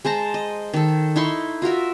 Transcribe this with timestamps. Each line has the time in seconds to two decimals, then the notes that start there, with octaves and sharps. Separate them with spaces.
0.05 G#3 C5 A5 A#5
0.34 D#5
0.73 D#3 A4
1.16 D#4 E4 C6 C#6
1.62 F4 F#4 A#4 E5